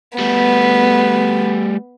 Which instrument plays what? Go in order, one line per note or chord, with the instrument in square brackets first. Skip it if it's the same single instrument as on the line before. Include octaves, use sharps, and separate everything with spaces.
[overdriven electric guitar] G3 A3 [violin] B3